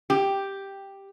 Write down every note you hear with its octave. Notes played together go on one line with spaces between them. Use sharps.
G4